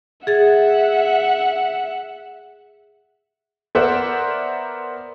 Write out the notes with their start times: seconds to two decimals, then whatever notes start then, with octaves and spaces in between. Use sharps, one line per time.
0.27 G#4 E5 F#5 A6
3.75 B3 A#4 C5 D5 E5 F#5